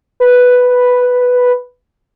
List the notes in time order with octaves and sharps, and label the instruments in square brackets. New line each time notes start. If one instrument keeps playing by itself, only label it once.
[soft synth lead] B4